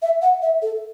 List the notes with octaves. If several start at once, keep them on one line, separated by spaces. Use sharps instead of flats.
E5
F#5
E5
A4